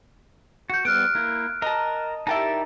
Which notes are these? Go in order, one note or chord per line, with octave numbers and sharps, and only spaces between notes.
F#4 G6 C#7
G3 B3 F6 F#6 D7
A#3 E4
A#4 D#5 A5 A#5
D#4 E4 G4 A#4 D5 A5